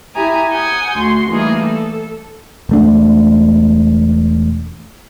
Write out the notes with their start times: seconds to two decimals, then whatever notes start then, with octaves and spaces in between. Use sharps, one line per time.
0.15 E4 G4 G#5 A#5 D#6
0.51 F#5 G#5 D#6 G6
0.95 D2 F#4 C6
1.30 E3 G3 A3 A#3 D#4 G#4
1.62 A4
2.69 E1 A3 D4